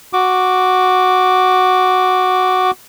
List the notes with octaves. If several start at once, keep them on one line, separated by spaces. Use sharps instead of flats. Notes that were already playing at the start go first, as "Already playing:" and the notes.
F#4 D6